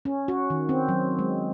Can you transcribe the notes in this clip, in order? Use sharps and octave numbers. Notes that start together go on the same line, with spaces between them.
C#4
F#4
D#3
C4
F#3
G#3